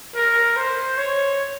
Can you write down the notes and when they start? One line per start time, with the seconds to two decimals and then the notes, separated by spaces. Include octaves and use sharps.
0.15 A#4
0.56 C5
0.97 C#5